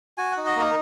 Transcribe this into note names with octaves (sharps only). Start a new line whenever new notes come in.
F#4 G#5
D#4 F#5
D#5
A#3 A#4